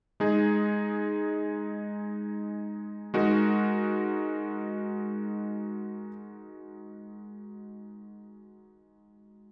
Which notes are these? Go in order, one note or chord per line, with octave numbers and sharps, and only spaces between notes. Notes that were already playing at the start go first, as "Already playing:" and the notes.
G#3 D#4 G#4
G#3 D#4 F#4 A#4